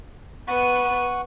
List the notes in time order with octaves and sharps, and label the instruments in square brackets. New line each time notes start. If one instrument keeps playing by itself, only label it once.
[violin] B3 D#7 [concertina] F#5 C#6